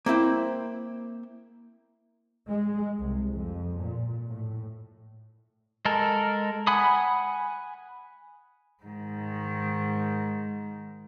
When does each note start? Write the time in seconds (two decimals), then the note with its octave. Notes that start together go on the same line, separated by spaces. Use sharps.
0.06 A#3 C4 E4 G5
2.49 G#3
2.99 C2
3.32 F2
3.78 A#2
4.27 A2
5.85 G#3 A4 A#4
6.67 F#5 G#5 B5 D#6
8.84 G#2 D#3